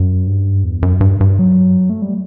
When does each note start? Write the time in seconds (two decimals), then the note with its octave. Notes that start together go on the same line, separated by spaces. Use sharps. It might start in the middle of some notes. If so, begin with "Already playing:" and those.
Already playing: F#2
0.27 G2
0.64 E2
0.82 F#2
1.01 G2
1.21 G2
1.39 F#3
1.90 A3
2.02 G3